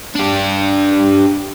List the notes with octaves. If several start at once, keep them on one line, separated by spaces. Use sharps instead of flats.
D4 G4